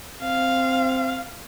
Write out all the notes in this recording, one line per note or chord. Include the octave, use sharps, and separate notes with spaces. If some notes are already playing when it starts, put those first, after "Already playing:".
C4 F5